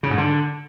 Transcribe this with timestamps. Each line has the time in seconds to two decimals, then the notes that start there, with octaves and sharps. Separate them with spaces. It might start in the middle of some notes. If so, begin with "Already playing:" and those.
0.03 C#3
0.10 G#2
0.18 D3